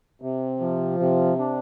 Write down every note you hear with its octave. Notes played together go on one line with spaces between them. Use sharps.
C3
F3
C3
D4